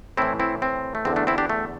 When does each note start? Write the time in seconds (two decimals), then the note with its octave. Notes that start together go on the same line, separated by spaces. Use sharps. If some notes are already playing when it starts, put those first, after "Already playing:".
0.17 A2 E3 C4 E4
0.40 C4 E4
0.62 C4
0.95 A3
1.05 E2 D3 C4
1.16 A3 D4
1.27 C4 E4
1.38 D4 G4
1.50 A3